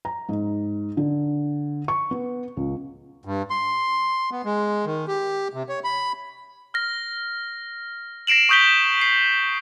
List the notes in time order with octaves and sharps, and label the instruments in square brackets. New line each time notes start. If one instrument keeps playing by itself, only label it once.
[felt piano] A#5
G#2
D3
C#6
B3
C#2
[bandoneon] G2
C6
B3
G#3
D#3
G4
C3
C#5
B5
[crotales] F6 A#6
A#6 C7 D7 E7 F#7
C#6 D#6 G6 B6 G7
C7